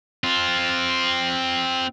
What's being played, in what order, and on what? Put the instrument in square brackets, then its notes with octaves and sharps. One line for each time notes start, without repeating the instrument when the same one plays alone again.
[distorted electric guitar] C4 F4